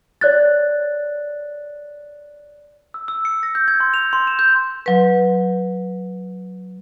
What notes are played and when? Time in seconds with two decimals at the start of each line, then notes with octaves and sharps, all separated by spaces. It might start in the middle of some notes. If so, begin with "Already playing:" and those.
0.21 C#5 D5 F#6 A6
2.94 E6
3.08 E6
3.25 C#7
3.43 A#6
3.55 G6
3.68 G#6
3.80 C6
3.94 F7
4.13 C6
4.27 E7
4.39 G6
4.86 F#3 B4